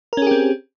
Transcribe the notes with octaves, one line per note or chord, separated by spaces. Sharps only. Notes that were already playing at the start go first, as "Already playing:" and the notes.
C4 C#4 G4 G#4 A#4